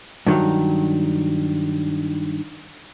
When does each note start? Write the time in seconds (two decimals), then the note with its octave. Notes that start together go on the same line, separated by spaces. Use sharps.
0.26 G2 D#3 F#3